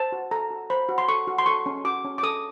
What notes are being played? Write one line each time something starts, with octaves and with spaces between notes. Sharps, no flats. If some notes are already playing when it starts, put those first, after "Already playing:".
Already playing: C5 A5
F#4
A4 A#5
F#4
C5 B5
F#4
C6
A4 C#6
F#4
C6
A4 C#6
C#4
F#4 D6
C#4
D6
A4 D#6